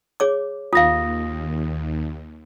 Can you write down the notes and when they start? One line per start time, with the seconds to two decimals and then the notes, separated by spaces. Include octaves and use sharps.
0.20 G#4 C#5 D6
0.73 D#2 F4 F5 D#6 A#6